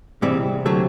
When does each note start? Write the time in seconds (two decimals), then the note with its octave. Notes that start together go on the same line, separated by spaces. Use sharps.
0.22 G#2 C3 E3 G3 C4
0.66 D3 F#3 A3